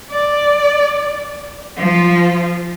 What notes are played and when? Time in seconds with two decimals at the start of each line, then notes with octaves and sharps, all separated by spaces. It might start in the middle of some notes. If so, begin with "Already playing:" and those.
0.11 D5
1.77 F3 F4